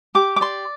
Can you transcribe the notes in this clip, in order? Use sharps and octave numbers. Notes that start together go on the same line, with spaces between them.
G4 D6
D6
D5 C6